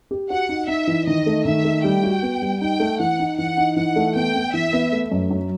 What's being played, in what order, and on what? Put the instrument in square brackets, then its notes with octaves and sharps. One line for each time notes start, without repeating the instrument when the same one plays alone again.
[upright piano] G4
[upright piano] F#4 [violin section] F#5
[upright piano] D#4
[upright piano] D#4 [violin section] E5
[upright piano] E3
[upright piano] D#3 [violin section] D#5
[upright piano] A3
[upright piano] D#3 [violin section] E5
[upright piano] A3
[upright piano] G3 [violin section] G5
[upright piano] F#4
B3
G3
[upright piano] D#4 [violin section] G5
[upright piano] A3
[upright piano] E3 [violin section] F#5
[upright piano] D#4
[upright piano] E3 [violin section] F#5
[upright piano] D#4
[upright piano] E3 [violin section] F#5
[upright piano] A3
[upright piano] B3 [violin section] G5
[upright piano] B3
[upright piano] E3 [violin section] E5
[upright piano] B3
A3
F#2
F#3